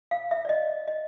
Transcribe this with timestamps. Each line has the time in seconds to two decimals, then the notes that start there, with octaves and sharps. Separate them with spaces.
0.11 F5
0.31 E5
0.45 D5
0.49 D#5
0.88 D#5